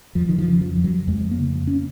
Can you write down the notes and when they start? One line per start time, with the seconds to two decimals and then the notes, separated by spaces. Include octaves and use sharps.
0.15 F2 F3
0.29 D#3
0.38 F3
0.47 C#3
0.61 F3
0.77 F2
0.84 F#3
1.08 F2 G#3
1.31 A#3
1.39 C#3
1.67 C#4